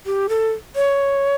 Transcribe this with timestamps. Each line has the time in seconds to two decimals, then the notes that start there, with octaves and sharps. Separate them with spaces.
0.06 G4
0.29 A4
0.76 C#5